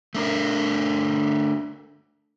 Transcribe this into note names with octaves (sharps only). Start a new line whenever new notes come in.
A3 D4 A#4